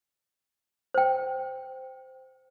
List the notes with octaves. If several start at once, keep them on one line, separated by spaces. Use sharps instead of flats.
C5 G5